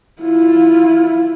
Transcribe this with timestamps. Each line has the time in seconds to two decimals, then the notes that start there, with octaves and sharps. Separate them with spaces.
0.21 E4 F4